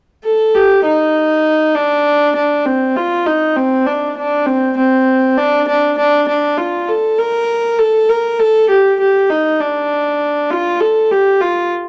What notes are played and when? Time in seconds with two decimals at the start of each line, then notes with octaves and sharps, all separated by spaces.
0.25 A4
0.55 G4
0.85 D#4
1.75 D4
2.36 D4
2.66 C4
2.97 F4
3.27 D#4
3.57 C4
3.87 D4
4.17 D4
4.47 C4
4.77 C4
5.37 D4
5.68 D4
5.98 D4
6.28 D4
6.58 F4
6.88 A4
7.19 A#4
7.79 A4
8.09 A#4
8.40 A4
8.69 G4
9.00 G4
9.30 D#4
9.60 D4
10.51 F4
10.80 A4
11.11 G4
11.41 F4